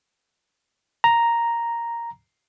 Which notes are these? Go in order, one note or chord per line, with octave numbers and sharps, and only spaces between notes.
A#5